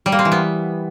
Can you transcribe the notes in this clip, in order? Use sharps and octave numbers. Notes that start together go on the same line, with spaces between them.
G3
A#3
C4
E3
B3